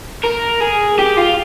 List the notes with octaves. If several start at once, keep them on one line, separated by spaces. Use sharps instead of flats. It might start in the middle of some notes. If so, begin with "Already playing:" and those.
A#4
G#4
G4
F4